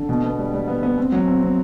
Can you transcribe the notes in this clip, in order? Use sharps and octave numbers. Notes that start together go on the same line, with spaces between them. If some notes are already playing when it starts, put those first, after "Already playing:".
Already playing: D3
B2
B3
G3
G3
B3
B3
C4
F#3
C4
C4